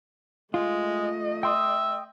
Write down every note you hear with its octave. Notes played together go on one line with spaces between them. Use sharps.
G#3 A3 F4 D#5
E5 G5 C6 D#6